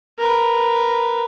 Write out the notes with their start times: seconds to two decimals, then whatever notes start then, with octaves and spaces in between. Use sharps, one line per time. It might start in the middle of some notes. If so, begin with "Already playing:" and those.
0.19 A#4 B4